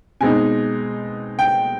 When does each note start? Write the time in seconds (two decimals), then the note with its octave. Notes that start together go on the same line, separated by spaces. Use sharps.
0.21 B2 G#3 C4 D#4 G#5
1.39 G5